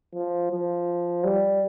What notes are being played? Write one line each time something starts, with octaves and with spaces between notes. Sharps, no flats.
F3
F3
G3